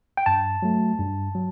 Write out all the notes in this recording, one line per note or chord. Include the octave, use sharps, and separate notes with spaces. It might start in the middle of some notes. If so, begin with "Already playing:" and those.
G5
G2 A5
F#3 A3
G2
F#3